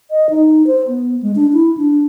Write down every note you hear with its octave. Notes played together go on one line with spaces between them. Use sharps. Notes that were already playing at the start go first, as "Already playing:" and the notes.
D#5
D#4
C5
B3
G#3
D4
E4
D4